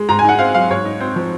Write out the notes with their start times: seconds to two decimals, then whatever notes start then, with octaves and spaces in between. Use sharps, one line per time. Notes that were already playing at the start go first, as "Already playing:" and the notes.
Already playing: G#3
0.09 G#2 A#5
0.19 G#5
0.24 D#4 F#5
0.39 C4 F5
0.54 F#3 F5
0.70 G#2 C#5
0.85 D#4
1.00 C4 C5
1.16 F3